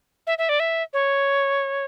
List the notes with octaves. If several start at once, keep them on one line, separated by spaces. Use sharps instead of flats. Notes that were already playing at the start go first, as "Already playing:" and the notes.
E5
E5
D5
E5
C#5